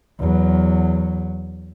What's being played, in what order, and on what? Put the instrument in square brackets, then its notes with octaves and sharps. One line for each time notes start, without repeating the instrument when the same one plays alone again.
[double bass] E2 F#3